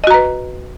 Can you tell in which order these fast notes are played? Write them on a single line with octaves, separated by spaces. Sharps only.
D#5 F#4 A#5 B4